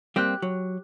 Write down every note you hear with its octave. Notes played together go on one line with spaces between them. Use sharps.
G3 A#3 C4 G4 F#6
F#3